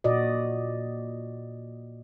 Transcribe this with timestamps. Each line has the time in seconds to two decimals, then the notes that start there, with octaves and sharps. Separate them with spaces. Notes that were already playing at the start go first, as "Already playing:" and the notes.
0.04 A#2 F#4 D5 D#5